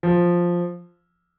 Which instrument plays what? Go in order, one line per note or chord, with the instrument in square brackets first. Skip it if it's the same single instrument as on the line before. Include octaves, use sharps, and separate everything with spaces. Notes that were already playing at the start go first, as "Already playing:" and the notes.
[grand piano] F3